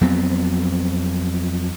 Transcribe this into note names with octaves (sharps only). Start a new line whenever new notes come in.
F2 F#3 B3 C4